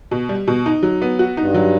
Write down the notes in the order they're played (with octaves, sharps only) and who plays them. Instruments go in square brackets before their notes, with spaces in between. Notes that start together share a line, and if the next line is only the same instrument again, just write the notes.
[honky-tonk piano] B2
G3
B2
D#4
F#3
B3
F#4
[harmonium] G2 [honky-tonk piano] D#4
[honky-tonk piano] F#3